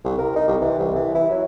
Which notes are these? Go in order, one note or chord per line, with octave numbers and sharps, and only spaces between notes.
C2
A#4
D#4
C2
E3
C2
E3
E4
F#3